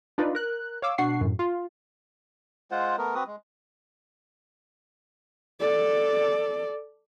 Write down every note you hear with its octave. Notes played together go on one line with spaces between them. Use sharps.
D4 D#4 F4 B4 D5
A#4 F#6
C#5 F5 D6 E6
B2 D4 F#5 C#6 C7
F#2 A2
F4
G#3 F4 C5 F#5
A3 B3 A#4
C4 F#4 B4 D#6
G#3
A4 D5